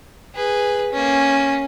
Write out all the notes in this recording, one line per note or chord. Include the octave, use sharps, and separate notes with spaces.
G#4 B4
A#3 C#4